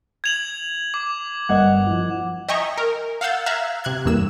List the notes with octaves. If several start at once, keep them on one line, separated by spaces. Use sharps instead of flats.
G#6 F7 F#7
D6
G1 A#4 D#5 F#5 G#6
F3 E4
D#5 E5 G5 G#5 A#5 C#6
A#4
F5 F#5 E6 G6 A6
E5 F5 A#5 E6 F#6 G#6
C3 F#6 G#6
E2 G2 A#3 E6 E7